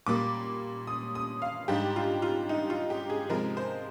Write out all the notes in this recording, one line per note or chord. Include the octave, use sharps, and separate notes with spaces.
A#2 G3 A#3 D6
D#6
D#6
F5
G#2 G3 D4 G4
F4
F4
D#4
F4
G4
G#4
C3 F3 G#3 C4 A#4
C5